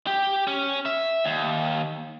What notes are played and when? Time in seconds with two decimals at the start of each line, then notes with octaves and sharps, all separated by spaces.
0.07 G4
0.47 C#4
0.86 E5
1.24 D#2